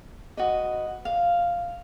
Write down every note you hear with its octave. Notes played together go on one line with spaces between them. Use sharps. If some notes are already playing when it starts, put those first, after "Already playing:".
F#4 B4 D#5
F5